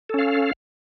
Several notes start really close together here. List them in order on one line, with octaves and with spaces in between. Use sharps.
A4 C#4 F5